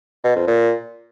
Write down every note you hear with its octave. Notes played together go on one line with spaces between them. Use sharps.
B2
F2
A#2